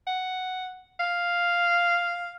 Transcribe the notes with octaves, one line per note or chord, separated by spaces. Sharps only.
F#5
F5